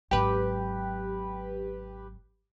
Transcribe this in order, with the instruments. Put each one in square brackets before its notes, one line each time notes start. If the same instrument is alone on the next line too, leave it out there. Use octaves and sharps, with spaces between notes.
[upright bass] G#1 F#3 [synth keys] G4 B4